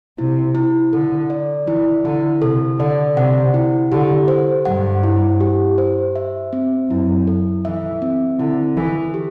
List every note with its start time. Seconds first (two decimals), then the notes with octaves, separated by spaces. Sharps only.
0.18 C3 E4
0.55 E4
0.93 D3 A4
1.30 D5
1.67 E3 E4
2.04 D3 E4
2.42 C3 A4
2.79 D3 D5
3.16 C3 F#5
3.54 E4
3.92 D3 G4
4.28 C5
4.65 G2 F#5
5.03 E4
5.41 G4
5.78 C5
6.16 E5
6.53 C4
6.90 F#2 E4
7.27 A4
7.65 E3 E5
8.02 C4
8.39 D3 E4
8.77 E3 A4
9.14 G4